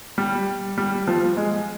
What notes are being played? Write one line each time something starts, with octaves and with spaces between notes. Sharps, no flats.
G3
G3
F3
G#3